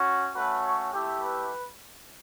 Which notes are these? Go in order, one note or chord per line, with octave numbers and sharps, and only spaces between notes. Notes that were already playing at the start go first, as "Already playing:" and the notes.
Already playing: C#4 F#4
A3 C#4 F#4 B4
C#5
A3 E4 G4
B4